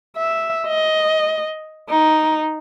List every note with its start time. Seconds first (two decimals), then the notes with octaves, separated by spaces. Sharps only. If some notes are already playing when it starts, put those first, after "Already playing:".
0.17 E5
0.67 D#5
1.90 D#4